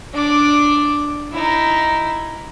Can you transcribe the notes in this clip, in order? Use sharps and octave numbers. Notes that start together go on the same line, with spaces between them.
D4 D6
D#4 E4